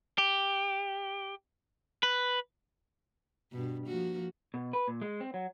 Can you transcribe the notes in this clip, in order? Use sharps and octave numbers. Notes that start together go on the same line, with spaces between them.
G4
B4
G2 B2
F3 A#3 F#4
B2
B4
A#2
G#3
C4
F#3